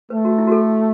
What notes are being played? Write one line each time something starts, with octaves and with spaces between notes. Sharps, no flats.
A3 B4
F#4
E4
F#4
A4